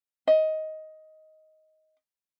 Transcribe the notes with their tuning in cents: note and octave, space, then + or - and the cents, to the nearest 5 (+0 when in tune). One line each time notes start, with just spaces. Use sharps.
D#5 +10